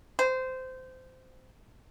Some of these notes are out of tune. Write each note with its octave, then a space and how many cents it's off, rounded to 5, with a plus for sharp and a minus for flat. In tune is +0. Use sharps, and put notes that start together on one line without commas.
C5 -20